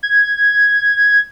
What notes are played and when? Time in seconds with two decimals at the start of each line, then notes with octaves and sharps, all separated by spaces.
0.03 G#6